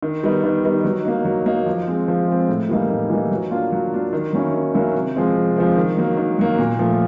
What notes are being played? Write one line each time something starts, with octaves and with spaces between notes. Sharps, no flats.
D#3
G3 B3 D#4
D#3
G3 B3 D#4
F#3
A#3 D#4
F#3
A#3 D#4
F3
G#3 C4
F3
G#3 C4
A2
E3 G3 A#3 D#4
A2
E3 G3 A#3 D#4
F#3
A#3 D4 F4
F#3
A#3 D4 F4
D#3
F#3 A#3 C#4 E4
D#3
F#3 A#3 C#4 E4
C3
F3 G#3 C4
C3
F3 G#3 C4
D#3
F#3 A#3
D#3
F#3 A#3
A#2
F3 A3